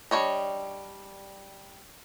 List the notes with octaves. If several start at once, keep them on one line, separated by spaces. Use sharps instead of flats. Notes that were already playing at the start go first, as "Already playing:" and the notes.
G3 D4 C5 C#5 D#5